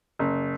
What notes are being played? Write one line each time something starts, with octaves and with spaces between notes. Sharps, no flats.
F#1